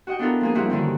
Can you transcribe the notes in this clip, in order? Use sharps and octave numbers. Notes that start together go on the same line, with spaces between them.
F#4 D#5 F#5 G5
B3 D4 E4 F4 A4 A#4
F3 A#3 G#4
G2 F3 A#3 C4 E4 F#4
F#2 D3 D#3 C4